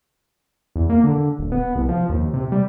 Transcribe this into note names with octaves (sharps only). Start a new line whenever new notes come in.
E2
A#3
D3
D#1
B3
C2
F3
D#2
C3
G3